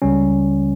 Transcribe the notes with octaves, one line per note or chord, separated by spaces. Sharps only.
C#2 C#3 G3 C#4